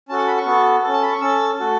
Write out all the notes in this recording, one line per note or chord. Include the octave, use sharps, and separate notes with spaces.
C#4 F#4 A4 A5
F#5
B5
C#6
B3 F#4 A4
C#4 A4
A5
B5
C#6
C#4 A4 E6
A3 F#4 A4